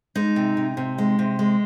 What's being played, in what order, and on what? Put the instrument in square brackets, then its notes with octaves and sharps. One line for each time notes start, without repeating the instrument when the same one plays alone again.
[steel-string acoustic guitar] G#3 D#4
C3
C3
C3
G#3
C3
G#3